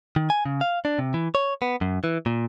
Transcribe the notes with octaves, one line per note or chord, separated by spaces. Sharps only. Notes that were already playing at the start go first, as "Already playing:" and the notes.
D#3
G#5
C#3
F5
D4
C3
E3
C#5
B3
F#2
E3
A#2